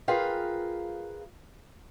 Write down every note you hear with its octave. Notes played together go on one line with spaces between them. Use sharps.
F4 G#4 A#4 B4 F5 G5